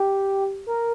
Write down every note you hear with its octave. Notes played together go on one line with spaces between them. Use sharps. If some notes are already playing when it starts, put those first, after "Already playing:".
Already playing: G4
A#4